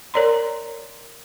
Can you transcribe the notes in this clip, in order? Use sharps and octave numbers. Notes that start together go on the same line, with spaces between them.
A#4 C#5 D5 A#5 C6